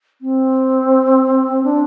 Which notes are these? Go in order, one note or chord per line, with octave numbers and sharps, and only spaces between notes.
C4
D4